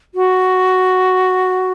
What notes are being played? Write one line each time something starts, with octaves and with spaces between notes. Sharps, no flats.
F#4